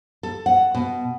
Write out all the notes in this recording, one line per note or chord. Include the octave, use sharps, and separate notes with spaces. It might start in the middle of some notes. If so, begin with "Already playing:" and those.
A4
F#5
B2